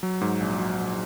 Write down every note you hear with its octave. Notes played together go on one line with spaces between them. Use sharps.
F#3
G#2
A#1
F#3
A#1